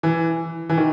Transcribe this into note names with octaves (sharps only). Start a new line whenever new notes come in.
E3
E3
D#3